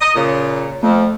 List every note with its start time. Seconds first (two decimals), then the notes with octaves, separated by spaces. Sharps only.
0.01 D#5
0.16 A#2 C#3
0.83 F2 A3